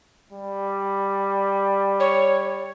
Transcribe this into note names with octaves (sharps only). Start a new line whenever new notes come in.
G3
C#5